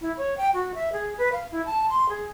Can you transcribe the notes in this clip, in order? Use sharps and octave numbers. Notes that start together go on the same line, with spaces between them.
E4
C#5
G5
F#4
E5
G#4
B4
F5
E4
A5
C6
G#4